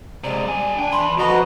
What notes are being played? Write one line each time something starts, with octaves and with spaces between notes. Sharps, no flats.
C3 G#3 D5
G3 G#5
D4 G5 G#5
E3 B5 C6
D3 F3 F#4 B4 D#5 A#5